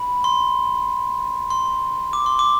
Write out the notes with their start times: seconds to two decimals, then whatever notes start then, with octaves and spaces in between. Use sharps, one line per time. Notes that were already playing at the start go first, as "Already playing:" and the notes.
Already playing: B5
0.24 C6
1.50 C6
2.13 D6
2.26 C6
2.39 D6